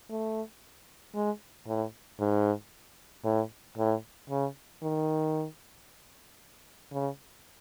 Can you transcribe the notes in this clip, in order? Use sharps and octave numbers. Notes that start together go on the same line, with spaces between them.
A3
G#3
A2
G#2
A2
A2
C#3
D#3
C#3